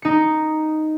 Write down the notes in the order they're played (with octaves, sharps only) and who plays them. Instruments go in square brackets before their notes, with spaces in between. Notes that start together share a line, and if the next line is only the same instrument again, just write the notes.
[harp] D#4 C#7